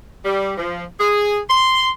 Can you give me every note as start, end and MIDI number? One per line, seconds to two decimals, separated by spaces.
0.25 0.54 55
0.58 0.83 53
0.99 1.37 68
1.50 1.89 84